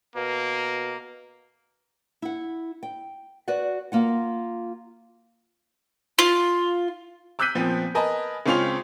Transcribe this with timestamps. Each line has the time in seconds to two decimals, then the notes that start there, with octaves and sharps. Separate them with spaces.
0.16 B2 A#3
2.22 E4 F#5
2.83 G5
3.48 F#4 B4 D5 F#5
3.92 A#3 F4 F#5
6.19 F4
7.39 D6 E6 F#6 G6 B6 D#7
7.55 A#2 F3 B3 C4
7.95 A#4 B4 D#5 G#5 A5 B5
8.46 C#2 C4 C#4 F4 C6 F7